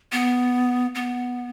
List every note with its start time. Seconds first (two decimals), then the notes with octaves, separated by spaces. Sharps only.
0.12 B3
0.95 B3